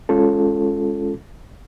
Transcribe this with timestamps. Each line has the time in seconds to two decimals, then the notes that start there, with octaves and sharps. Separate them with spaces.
0.09 G#3 C#4 F4 A4